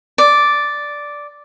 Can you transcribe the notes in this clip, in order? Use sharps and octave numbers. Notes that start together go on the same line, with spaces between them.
D5